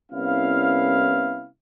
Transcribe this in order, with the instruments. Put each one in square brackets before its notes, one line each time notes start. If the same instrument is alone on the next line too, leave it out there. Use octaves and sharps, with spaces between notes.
[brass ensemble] C2 B3 C#4 E4 F5